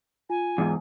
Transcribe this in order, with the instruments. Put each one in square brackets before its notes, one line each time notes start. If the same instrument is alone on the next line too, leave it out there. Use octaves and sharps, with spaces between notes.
[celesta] F4 [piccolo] G#5
[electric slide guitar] E2 G#2